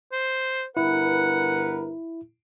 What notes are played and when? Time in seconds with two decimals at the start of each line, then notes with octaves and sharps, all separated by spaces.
0.12 C5
0.77 G1 E4 A#4 B4 F#5